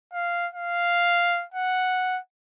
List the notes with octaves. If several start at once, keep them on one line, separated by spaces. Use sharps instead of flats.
F5
F5
F#5